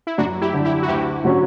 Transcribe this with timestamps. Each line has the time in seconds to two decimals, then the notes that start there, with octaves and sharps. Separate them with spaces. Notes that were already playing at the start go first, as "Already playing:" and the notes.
0.07 E4
0.18 F#2 D4 F#4
0.41 E4 G4
0.53 D3 G3 D4
0.64 E4 G4
0.83 F#4
0.88 D2 E4 G4
1.24 D3 F#3 C#4 F#4